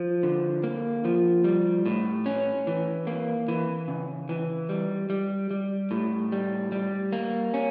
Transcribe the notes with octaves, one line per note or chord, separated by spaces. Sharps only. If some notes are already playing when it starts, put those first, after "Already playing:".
Already playing: F3
D3
A#3
F3
G3
A2
C#4
E3
A#3
E3
C#3
E3
G3
G3
G3
A2
G3
G3
A#3
C#4